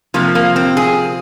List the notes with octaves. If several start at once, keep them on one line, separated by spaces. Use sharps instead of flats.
C3 F3 A#3
A#3
C4
G#4